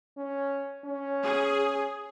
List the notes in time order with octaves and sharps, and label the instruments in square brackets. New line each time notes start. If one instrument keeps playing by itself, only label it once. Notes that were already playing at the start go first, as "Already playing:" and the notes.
[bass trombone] C#4
C#4
[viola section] G#4